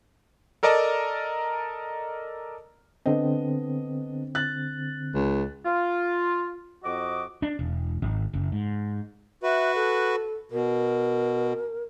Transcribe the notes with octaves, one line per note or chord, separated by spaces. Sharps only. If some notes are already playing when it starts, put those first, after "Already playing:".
A4 A#4 D5 D#5 A5 A#5
D3 B3 C4 D4 D#5
F#6 A6
C#2
F4
F2 F#4 D#5 D6
D4
E1
G#1
F#1
G#2
F#4 B4 E5
A4
B2 A#4